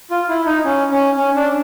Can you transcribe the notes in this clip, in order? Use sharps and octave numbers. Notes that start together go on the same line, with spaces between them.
F4
E4
D#4
C#4
C#4
C#4
D4